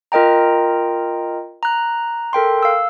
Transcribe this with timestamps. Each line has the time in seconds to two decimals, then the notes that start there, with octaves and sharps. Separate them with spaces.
0.12 F4 A#4 D#5 G5 A#5
1.63 A#5 F#6
2.33 A4 A#4 G5 C6
2.62 F5 E6